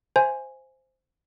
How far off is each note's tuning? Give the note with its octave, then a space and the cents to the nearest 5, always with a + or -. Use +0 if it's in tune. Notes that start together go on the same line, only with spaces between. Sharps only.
C5 +0 E5 +30 G#5 +0